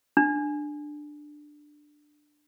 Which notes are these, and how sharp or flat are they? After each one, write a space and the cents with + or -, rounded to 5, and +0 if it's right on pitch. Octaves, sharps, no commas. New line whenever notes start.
D4 +10